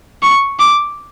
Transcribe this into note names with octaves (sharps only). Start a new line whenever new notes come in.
C#6
D6